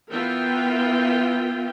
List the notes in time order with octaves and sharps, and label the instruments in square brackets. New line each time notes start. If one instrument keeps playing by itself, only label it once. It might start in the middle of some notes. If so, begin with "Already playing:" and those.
[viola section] E3 B3 F4 A#4 E5 G5